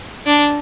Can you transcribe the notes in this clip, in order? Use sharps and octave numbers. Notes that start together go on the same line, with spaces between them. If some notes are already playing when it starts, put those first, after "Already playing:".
D4